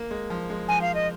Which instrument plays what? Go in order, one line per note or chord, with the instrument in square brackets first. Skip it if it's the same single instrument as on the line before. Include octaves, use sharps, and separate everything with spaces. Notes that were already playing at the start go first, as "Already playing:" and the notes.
Already playing: [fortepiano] A#3
G#3
F3
G#3
[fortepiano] F3 [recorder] G#5
[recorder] F5
D#5